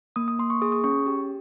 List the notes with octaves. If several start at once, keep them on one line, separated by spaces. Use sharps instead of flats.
A#3 D#6
D#6
A#3 C6
C#6
G#4 D#6
D#6
C#4 C#6
G4